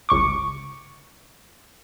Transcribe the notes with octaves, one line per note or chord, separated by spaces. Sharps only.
G1 C#2 C#6 D6